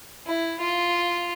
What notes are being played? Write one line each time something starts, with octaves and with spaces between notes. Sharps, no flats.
E4
F4